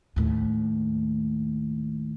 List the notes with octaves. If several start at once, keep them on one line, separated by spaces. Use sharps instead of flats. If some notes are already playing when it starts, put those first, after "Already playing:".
D#2 A2